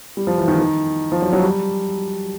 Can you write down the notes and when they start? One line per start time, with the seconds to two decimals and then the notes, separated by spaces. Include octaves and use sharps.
0.17 G3
0.27 F3
0.38 E3
0.48 D#3
0.58 D#3
1.12 F3
1.22 F#3
1.33 F#3
1.42 G3